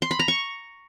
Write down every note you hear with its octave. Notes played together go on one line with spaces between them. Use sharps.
C6
B5
A#5
C#6